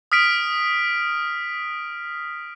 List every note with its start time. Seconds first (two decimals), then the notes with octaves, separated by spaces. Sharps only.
0.12 D#6 F6 B6 D7